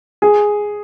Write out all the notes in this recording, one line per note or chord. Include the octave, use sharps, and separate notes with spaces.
G#4